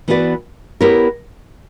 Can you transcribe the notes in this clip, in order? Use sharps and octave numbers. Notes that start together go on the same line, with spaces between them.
E3 B3 F#4 B4 D5
B3 E4 G4 A#4 C#5